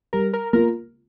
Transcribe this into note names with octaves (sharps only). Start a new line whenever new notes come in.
G3 A#4
A#4
A#3 F4 A#4